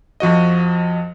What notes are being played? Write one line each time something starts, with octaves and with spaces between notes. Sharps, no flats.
F2 F3 F#4 D#5